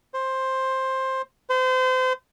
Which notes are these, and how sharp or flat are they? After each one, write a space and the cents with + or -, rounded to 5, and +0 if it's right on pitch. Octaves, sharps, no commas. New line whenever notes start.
C5 +10
C5 -30